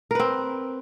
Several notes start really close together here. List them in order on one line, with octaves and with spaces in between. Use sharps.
A#4 B4 C4